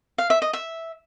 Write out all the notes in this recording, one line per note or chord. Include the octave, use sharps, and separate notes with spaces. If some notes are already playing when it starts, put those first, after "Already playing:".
F5
E5
D#5
E5